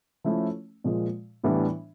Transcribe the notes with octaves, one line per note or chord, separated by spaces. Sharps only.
F3 A3 C#4 E4
A#2 F3 G#3
A2 E3 G3 B3 D4